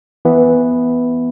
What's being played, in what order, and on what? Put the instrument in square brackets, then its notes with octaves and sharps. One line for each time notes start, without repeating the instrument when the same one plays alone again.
[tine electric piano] E3 B3 E4